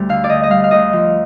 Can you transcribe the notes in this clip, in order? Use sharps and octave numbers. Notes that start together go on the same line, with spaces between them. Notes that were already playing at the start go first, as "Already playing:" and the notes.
Already playing: D2 G3 C5
D3 F5
D5
D2 D#5
D#5
G3 F5
F5
D2 D#5
F3